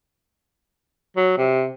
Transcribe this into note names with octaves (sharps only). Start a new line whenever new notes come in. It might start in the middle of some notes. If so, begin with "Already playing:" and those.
F#3
C3